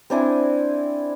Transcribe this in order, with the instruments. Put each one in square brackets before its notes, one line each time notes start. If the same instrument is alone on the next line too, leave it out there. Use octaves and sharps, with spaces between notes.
[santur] C4 D4 E4 G#5